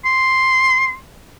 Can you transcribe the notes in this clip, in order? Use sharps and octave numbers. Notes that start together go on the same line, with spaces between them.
C6